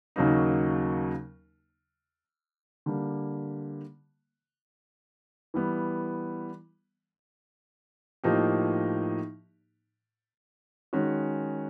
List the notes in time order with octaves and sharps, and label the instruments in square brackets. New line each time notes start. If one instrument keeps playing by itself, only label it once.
[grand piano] D#2 C#3 F#3 A#3 D#4
D3 G3 A#3
E3 G3 B3
A2 F3 A#3 D#4 G4
D#3 G#3 C#4 F#4